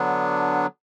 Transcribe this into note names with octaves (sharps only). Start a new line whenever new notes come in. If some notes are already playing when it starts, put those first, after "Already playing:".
Already playing: D3 F#3 B3 D4